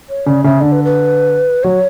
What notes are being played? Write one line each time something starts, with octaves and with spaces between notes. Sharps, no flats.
C#5
C#3 D5
C#3 E5
D3 D5
B4
B4
F#3 C#5